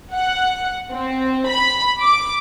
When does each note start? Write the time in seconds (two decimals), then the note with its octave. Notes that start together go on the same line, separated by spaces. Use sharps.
0.13 F#5
0.93 C4
1.47 B5
2.00 D6